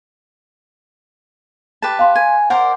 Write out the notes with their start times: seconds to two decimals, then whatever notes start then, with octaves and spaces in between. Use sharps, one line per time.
1.82 G4 B4 A5
1.99 F5 C6
2.16 G#5
2.50 A#4 C5 D5 F#5